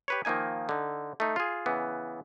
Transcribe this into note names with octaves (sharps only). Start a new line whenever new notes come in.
G4 B4 C#5
D#3 F3 A#3 D#4 G#5
D3 D#4
A3 D#4
F4 G#4
C#3 E3 B3